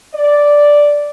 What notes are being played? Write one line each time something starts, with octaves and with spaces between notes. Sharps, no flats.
D5